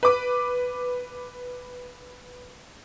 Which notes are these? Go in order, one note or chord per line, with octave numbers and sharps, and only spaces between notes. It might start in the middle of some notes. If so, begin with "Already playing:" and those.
B4 D6